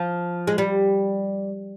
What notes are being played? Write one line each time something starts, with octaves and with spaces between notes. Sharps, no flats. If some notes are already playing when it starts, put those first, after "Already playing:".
Already playing: F3
G#3
G3